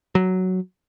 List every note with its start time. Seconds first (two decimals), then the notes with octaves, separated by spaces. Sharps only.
0.15 F#3